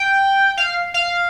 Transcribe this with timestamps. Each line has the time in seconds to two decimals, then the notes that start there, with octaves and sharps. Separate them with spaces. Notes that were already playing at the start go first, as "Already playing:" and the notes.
Already playing: G5
0.57 F5
0.94 F5